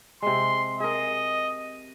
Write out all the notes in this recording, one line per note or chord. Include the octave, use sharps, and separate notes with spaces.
C3 G#3 C6
G#4 A#4 D#5